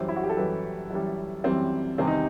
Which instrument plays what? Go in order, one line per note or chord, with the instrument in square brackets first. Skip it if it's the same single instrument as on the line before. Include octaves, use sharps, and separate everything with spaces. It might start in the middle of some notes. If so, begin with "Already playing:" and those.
Already playing: [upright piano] F#2 E3 G3 C5
E4
F#4
G4
A4
F#2 E3 G3 B4
F#2 E3 G3
F#2 E3 G3 C4
E2 C3 D#3 G3 C4
D#4